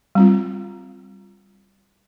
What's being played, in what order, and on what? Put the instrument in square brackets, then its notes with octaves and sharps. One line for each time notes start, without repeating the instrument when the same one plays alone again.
[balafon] G3 C4 F4